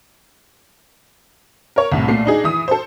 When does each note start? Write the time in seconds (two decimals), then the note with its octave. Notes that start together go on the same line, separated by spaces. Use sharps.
1.76 A#4 C#5
1.92 C2 A2
2.08 A#2 A3 C7
2.26 D4 D#4 G#4
2.44 E3 D#6
2.68 A4 C5